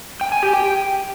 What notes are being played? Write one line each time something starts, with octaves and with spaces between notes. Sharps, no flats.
G5
G#5
G4
G5